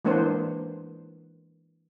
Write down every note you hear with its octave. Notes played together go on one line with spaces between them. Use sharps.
E3 G#3 A#3 D4 B4 C5